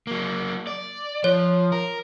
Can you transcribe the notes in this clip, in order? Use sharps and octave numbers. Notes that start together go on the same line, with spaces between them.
F#3 A#3
D5
F3 C#5
A#4